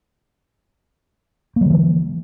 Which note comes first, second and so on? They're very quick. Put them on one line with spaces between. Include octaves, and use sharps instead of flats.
A#3 F#3 D3 E3